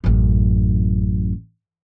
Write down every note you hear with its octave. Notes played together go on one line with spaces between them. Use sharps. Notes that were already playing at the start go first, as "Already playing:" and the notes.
A1 F#2